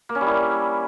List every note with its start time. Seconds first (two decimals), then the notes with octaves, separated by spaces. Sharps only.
0.09 A#3
0.15 C#4
0.21 G3
0.27 E4